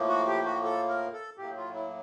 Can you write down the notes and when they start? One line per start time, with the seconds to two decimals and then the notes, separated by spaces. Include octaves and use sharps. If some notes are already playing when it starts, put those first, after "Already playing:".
Already playing: A2 F3 A#3
0.08 F#4
0.27 G4
0.45 F#4
0.64 A4
0.89 A#4
1.13 A4
1.38 A2 F#3 A#3 G4
1.57 F4
1.75 E4